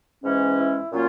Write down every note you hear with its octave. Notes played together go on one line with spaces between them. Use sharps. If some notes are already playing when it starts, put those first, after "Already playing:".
G#2 E3 G#3 C#4
E4
A#2 F#3 A#3 C#4 F4